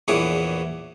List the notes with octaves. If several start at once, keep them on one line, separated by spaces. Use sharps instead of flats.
A#1 E2 E3 G#4 C#5 D6